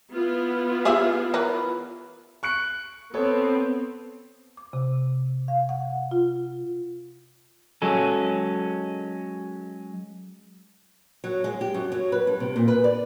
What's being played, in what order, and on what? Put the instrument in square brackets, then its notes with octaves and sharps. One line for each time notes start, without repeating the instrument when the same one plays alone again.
[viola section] B3 E4 F4
[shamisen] G4 G#4 E5
E3 A#4 B4
[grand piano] C#6 F#6 C#7
[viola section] B3 C4 [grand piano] A4 C#5
[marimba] D6
C3
F5
F#5
F4
[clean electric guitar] F#3 G#3 C#4 A4
[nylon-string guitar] F#3
G#3
G4
F#2
F#3
B4
G2
C3
A#2
B4
D5